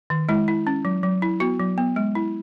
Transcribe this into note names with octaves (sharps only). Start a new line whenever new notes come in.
D#3
G#3 E4
E4
C#4
F#3
F#3
E4
B3 F#4
F#3
B3
G#3
E4